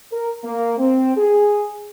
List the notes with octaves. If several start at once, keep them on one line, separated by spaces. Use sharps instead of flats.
A#4
A#3
C4
G#4